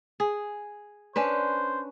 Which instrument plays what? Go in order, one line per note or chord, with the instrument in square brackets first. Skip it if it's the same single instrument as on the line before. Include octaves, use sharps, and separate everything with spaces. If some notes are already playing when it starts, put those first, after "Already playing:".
[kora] G#4
[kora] C#4 D4 B4 [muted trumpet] C5